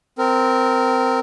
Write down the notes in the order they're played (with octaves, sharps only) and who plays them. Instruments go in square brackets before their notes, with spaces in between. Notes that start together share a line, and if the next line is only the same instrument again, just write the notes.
[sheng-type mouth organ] C4 A#4